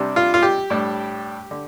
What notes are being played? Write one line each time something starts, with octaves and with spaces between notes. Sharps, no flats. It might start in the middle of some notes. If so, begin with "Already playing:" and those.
Already playing: C3 G3 D4
F4
F4
G4
A2 G3 D4
D3